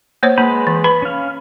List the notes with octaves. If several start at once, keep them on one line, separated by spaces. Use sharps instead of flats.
A#3 C5 C#5
G#3 A#3 B4 B5
E3
B4 B5
C#4 F5